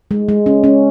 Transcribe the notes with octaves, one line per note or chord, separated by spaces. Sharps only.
G#3
G#3
C#4
C#4